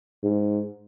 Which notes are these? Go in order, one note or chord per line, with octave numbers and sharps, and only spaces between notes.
G#2